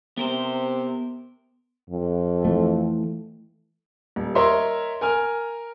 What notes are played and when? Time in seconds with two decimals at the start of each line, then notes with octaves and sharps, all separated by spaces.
0.18 C3 B3 A#4 C5
1.90 F2
2.45 E3 A3
4.16 D#1
4.35 A#4 C#5 D#5 E5 C6
5.01 A#4 G#5 F6